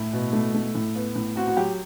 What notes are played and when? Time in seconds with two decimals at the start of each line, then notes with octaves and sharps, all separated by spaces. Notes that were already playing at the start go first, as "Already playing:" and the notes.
Already playing: A2 E4
0.13 B2
0.33 A3
0.54 A3
0.75 A2
0.95 B3
1.15 A2
1.36 C4 F#4
1.48 F#4
1.57 F#3 G4